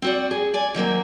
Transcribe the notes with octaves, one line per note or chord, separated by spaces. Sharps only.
C4 F#4 D5
G#4
D5 G#5
D#3 F#3 A#3 C4